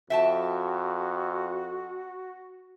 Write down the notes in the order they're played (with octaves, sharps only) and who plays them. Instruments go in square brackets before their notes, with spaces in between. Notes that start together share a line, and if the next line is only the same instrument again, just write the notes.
[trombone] F2 [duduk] F#4 [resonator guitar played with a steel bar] E5 G5 A5